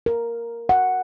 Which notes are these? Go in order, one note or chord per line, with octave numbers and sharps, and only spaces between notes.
A#4
F#5